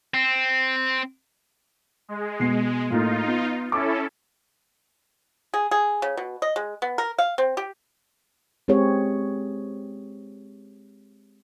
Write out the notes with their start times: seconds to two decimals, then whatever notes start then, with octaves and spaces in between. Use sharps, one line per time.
0.14 C4
2.09 G#3
2.40 B2 C7
2.90 A2 A#3 D#4 F4
3.28 B3
3.72 C#4 E4 A4 D6
5.54 G#4
5.71 G#4
6.02 C#3
6.17 B2
6.42 D#5
6.56 G#3
6.82 B3
6.98 A#4
7.18 F5
7.38 C4
7.57 G4
8.68 G#3 C4 G4 G#4 C#5